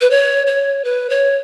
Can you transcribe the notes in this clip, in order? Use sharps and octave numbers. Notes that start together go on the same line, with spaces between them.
B4
C#5
C#5
B4
C#5